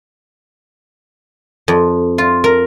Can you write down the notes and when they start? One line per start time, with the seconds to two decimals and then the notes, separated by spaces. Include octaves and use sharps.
1.68 F2
2.18 F4
2.44 A#4